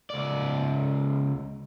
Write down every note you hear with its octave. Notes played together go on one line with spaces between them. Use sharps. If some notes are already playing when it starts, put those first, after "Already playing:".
C#2 D5